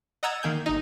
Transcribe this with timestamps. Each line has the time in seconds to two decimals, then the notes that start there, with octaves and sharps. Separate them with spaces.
0.23 D#5 F#5 A#5 E6 G#6 A6
0.43 D#3 A#3 G#5 G6
0.66 G1 D#4